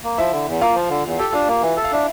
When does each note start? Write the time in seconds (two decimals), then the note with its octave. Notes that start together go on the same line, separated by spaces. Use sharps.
0.04 A#3
0.18 F3 E4 E5
0.32 D3
0.47 E2
0.61 A#3 F4 F5
0.75 F3
0.90 D3
1.05 E2
1.19 G4 A4 G5
1.33 D4 F4 F5
1.48 A#3
1.62 E3
1.77 A4 E5
1.84 F5
1.92 D4 E4 E5